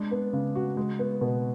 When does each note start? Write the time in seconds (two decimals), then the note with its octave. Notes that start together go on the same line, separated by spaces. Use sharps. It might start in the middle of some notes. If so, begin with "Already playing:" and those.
Already playing: G#3 D4
0.11 B3
0.33 C#3
0.55 F#4
0.77 G#3
0.99 B3
1.21 B2